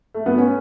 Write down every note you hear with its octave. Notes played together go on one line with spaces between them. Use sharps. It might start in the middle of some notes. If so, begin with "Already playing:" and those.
A3
B3
C#4